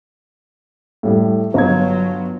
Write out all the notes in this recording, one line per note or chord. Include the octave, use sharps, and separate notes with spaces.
A2 G3
G1 F#3 A#5 G#6